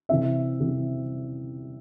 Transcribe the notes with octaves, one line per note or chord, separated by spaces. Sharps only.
C3 E3 C4 E5
C3 E3 C4